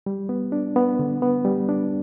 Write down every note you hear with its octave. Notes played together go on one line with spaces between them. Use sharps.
G3
B3
D4
B3
D3
B3
G3
D4